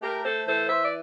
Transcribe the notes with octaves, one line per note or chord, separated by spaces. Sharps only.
A3 G4 A#4
A4 C5
E3 A4 C5
C5 E5
D5